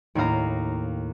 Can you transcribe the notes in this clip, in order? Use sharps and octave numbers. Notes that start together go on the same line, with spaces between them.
D#2 A2 D#4 F5 A#5